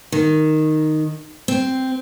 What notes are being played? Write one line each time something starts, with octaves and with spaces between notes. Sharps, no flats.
D#3
C4